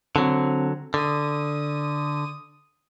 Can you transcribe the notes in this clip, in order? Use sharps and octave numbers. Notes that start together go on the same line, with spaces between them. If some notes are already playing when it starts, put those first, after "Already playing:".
D3 F#3 C4
D3 D#6